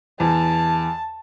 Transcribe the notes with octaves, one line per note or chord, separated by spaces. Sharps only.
E2 A5